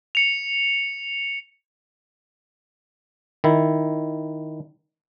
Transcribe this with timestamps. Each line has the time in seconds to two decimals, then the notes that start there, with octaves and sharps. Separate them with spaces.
0.15 C#7 F7
3.44 D#3 E4